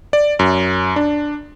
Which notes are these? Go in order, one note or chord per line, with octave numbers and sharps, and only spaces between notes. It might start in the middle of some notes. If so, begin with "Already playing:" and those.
D5
F#2
D4